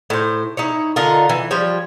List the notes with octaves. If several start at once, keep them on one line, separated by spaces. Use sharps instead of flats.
A2 C5
D#4 E4 C#5
D3 D#4 F4 A#4
E3
F3 G3 C#5